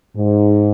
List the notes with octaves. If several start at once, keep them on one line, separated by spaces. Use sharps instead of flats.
G#2